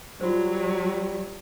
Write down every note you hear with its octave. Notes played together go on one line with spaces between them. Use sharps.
F#3 G3 F4 F#4 C5